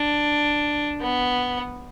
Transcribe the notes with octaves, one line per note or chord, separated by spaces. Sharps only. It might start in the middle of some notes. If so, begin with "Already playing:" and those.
Already playing: D4
B3